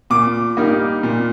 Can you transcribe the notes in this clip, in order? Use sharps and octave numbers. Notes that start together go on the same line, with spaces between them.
A#2 D6
G3 A#3 D#4
A#2